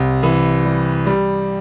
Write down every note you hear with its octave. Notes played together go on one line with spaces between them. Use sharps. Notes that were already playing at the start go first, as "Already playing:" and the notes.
Already playing: C2
E3
G3
G3